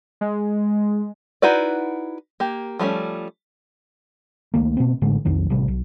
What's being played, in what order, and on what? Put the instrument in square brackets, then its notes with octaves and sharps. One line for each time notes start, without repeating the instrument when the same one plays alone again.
[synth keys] G#3
[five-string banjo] D#4 E4 F#4 B4 D5
A#3 G4
F3 G3 A3 C#4
[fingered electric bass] C#2 D#3 A3 A#3
B2 A#3 C4
A1 A2 D3 G#3
B1 F2 D#3 F#3
A1 C3 G3
B1